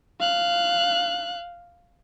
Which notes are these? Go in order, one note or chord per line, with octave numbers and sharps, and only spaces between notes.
F5 F#6